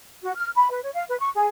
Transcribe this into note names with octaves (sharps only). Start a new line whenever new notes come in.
F#4
F6
B5
B4
C#5
F5
B4
C#6
G#4